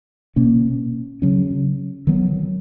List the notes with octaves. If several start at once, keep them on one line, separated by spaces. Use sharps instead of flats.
B2 A#3 C#4
C#3 F#3 C#4
D#3 F#3 B3